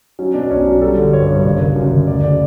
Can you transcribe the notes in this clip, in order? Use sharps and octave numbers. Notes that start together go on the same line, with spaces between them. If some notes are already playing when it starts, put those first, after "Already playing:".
F#3 C#4
B2 D4
B1 C#4
F#3 D4
G3 A4
D3
G2 C#5
G2
F#1 C#5
F#1
F#2
F#1
D2 D5
C#3 D5